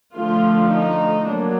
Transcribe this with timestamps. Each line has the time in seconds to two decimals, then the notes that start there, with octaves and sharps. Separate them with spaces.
0.16 D3 F3 A3 F4
0.72 D#4
1.28 F#3 A#3 D4